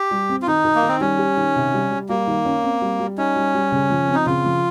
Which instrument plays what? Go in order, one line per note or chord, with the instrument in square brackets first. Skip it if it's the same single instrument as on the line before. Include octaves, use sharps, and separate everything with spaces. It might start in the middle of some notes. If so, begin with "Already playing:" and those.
Already playing: [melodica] G4
[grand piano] G3
C4
[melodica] F4
[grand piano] D#3 [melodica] D#4
[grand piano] D#3
[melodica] A#3
[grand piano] D#3
[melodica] C4
[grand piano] G3 [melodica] C#4
[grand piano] G4
D#3
C3
G3
G3
[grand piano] G3 [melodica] A#3
[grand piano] D#3
C#4
C4
G3
G3
[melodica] C#4 [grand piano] D#4
[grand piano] G3
G3
C#3
F3
C4
[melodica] D#4
[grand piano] C#3 [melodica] F4
[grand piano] F3